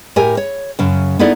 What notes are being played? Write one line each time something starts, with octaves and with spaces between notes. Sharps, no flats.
A2 G4 A#4 G#5
C#5
F#2 C#3
B3 D#4 E4 A4 D5